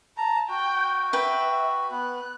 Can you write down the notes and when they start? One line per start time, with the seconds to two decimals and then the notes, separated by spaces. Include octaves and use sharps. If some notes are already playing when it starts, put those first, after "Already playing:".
0.17 A5 A#5
0.49 F#4 G5
1.13 B4 E5 G5
1.91 B3 F#6